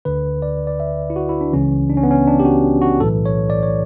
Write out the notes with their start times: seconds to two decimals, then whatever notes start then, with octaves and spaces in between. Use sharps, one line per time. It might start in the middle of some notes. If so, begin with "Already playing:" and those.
0.05 D2 D3 B4
0.42 D5
0.67 D5
0.80 E5
1.10 E4
1.16 F#4
1.29 E4
1.41 D4
1.53 C#2 C#3 E3 C#4
1.89 D4
1.97 C#4
2.03 B3
2.11 C#4
2.27 D4
2.39 G4
2.45 F#4
2.82 F#4
3.00 B1 A2 E3 A4
3.26 C#5
3.50 D5
3.63 C#5